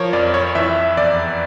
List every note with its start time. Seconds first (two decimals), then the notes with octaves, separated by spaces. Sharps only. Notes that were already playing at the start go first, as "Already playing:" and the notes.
Already playing: F3 A#4 C#5
0.13 F2 D5
0.34 C#5
0.55 E3 E5
0.97 E2 D5